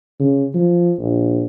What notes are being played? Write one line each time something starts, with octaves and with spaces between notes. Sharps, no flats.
C#3
F3
A#1